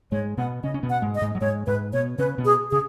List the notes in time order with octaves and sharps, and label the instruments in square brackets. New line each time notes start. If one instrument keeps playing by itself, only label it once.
[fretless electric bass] G#2 G#3 [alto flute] C#5
[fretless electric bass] B2 B3 [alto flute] F#5
[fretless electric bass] C#3 C#4 [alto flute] D#5
[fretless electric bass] C#4
B2 B3
[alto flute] F#5
[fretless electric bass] G#2 G#3
[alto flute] D#5
[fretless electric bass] G#2 G#3
F#3
[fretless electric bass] G#2 G#3 [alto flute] C#5
[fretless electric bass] G#2 G#3 [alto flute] B4
[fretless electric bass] B2 B3 [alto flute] C#5
[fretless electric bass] C#3 C#4 [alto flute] B4
[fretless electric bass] B2 B3
[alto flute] G#4
[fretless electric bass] C#3 [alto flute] G#4